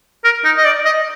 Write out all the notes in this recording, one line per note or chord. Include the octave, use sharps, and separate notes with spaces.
A#4
D#4
D#5
D5
D#5